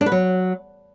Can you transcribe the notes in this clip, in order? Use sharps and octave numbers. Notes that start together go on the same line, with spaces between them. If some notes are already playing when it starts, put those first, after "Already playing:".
D4
B4
F#3